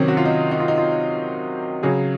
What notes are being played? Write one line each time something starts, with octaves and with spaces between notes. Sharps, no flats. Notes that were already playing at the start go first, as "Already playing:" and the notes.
Already playing: C3 D#3 F#3 C4 C#4
F#4
F4
D#4
D#4
F4
D#4
F4
C#3 F#3 G#4